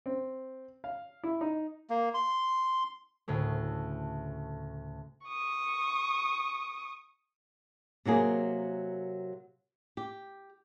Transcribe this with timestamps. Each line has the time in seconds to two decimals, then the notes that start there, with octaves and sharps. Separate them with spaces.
0.06 C4
0.84 F5
1.23 E4
1.41 D#4
1.90 A#3
2.14 C6
3.28 D2 A2 C#3 A3
5.27 C#6 D#6
8.05 C3 F#3 A#3 G#4
9.97 G4